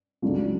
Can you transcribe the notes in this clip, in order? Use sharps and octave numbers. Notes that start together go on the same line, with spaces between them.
C#2 C#3 F#3 A3 D4